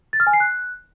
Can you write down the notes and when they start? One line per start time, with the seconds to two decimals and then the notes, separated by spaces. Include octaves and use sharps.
0.13 A6
0.20 F6
0.27 G#5
0.33 C7
0.40 F#6